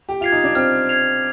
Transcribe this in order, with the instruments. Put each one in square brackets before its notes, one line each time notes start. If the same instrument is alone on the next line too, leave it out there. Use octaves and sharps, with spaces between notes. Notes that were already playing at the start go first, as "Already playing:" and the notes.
[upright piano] G4
[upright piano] F4 [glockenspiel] G#6 C7 F7
[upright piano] D#4
D4
[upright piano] C4 [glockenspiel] F6
[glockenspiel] G#6 C7 F7